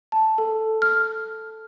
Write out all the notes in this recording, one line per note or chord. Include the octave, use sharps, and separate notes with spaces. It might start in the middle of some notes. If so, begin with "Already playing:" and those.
A5
A4
F6